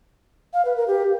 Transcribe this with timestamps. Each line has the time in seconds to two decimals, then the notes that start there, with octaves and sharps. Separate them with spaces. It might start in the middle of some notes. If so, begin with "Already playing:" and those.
0.53 F5
0.65 B4
0.76 A#4
0.88 G4